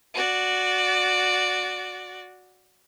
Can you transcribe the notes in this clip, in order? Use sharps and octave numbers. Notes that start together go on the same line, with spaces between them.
F#4 D5